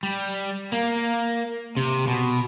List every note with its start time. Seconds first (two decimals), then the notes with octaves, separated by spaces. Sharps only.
0.03 G3
0.73 A#3
1.77 C3
2.07 B2